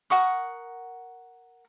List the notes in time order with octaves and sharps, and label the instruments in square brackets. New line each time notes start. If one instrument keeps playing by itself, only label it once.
[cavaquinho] A#4 F#5 C#6 D#6